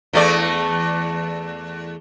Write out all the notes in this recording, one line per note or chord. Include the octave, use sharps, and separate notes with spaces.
E2 A3 D5